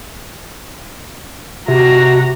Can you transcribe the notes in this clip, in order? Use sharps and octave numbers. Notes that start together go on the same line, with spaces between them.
C3 F#4 A#5